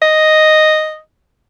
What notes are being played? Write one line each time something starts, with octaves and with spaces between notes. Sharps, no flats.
D#5